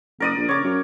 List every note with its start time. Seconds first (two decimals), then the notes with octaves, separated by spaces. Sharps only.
0.20 F#1 A#4 D5 D#6
0.37 A#1
0.49 C#3 C#5 D6
0.64 F#2